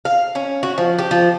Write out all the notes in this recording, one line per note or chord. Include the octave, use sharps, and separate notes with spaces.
F5
C#4
F#4
F3
G4
F3